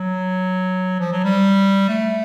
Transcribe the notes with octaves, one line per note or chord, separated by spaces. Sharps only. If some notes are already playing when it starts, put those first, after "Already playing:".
Already playing: F#3
F3
F#3
G3
A3